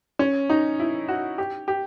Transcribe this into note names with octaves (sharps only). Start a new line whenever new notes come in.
C#4
D#4
E4
F#4
G4
G4